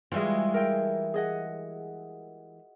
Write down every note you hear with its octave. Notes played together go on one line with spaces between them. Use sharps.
E3 G3 G#3 F4 F#4 E5
A#4 E5 G5
G#4 D#5 F#5